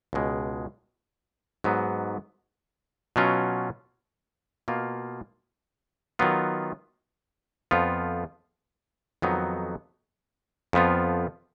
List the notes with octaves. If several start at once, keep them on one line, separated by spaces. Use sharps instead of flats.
C#2 B2 G#3
G#2 F#3 B3
B2 F#3 C#4 F4
B2 A#3 F4
D#3 F#3 B3 F4
F2 F3 B3 F4
F2 D#3 F#3 B3 D#4
F2 F3 B3 F4